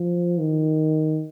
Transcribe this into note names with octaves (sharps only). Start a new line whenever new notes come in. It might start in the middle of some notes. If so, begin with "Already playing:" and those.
Already playing: F3
D#3